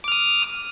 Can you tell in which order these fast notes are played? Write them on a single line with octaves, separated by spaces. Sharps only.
D6 F6 D#6